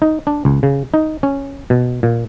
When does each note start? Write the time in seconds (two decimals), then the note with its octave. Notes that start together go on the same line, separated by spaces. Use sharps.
0.02 D#4
0.27 D4
0.45 C#2
0.63 C#3
0.94 D#4
1.23 C#4
1.70 B2
2.03 A#2